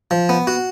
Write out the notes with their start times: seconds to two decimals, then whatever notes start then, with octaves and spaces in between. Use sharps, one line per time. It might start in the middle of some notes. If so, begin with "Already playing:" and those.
0.11 F3
0.29 B3
0.47 F#4